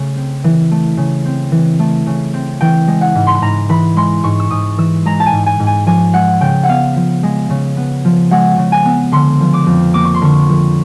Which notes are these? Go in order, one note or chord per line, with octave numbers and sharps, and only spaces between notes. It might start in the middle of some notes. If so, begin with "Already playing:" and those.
Already playing: C#3 A3
C4
E3
A3
C#3
C4
E3
A3
C#3
C4
E3 G5
G#3
F#5
G#2
C6
B5
G#2 A#5
E3 B5
G#3 C6
G#2 C#6
E6
G#2 D#6
E3 E6
G#3 A#5
A5
G#5
G#2
G#5
G#2
G#5
F3 G#5
G#3 F#5
C#3 G5
F#5
B3 F5
F3
G#3
C#3
B3
F3
G#3 F#5
C#3
G#5
B3
D3 C6
F3
D6
F2
A#3 D6
C#6
C6
D3 C#6
F3